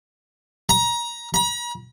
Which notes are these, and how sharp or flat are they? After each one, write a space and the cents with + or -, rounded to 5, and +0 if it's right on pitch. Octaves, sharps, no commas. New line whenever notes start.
A#5 +25
A#5 +45